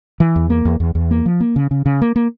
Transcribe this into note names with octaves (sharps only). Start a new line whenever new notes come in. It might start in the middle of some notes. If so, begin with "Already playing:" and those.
E3
E2
A#3
E2
E2
E2
A#3
F3
A#3
C#3
C#3
C#3
A#3
A#3